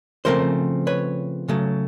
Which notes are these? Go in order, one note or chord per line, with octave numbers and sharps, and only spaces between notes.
C#3 F3 A3 C4 A#4 C5
B4 C#5
C#3 F#3 A3